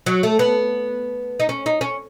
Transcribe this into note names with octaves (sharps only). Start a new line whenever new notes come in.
F#3
A3
B3
D#4
C#4
D#4
C#4